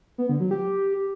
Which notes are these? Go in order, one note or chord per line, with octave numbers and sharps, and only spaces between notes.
B3
D3
F#3
G4